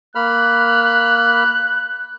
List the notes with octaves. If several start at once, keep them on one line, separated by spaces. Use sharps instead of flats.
A#3 B5 F6 F#6